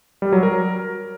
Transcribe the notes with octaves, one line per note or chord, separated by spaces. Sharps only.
G3
F#3
A#4